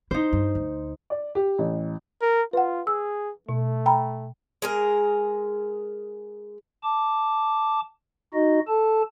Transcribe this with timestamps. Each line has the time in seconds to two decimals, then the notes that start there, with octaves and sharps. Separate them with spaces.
0.11 D#4 E4 C5
0.33 G2
0.55 D2
1.10 D5
1.35 G4
1.58 A1
2.22 A#4
2.53 F4 B4 F#5
2.87 G#4 E6
3.49 B2 A3
3.86 G5 A#5 B5
4.62 G#3 G#4 A#4
6.84 A5 D6
8.34 D#4 F#4 D#5
8.68 A4 A5